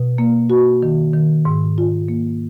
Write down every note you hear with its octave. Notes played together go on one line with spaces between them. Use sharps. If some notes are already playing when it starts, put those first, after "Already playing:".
Already playing: B2
A#3
F#4
D#3
D#3
G#2
F4
A#3